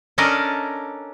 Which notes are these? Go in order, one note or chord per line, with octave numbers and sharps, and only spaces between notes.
C#4 D4 A4 A#4 D5 D#5